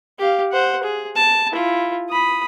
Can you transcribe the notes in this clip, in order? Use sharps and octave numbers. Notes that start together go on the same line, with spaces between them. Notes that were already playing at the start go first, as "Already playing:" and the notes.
G4 F5
C5 F#5
G#4
A5
E4 F4
B5 D#6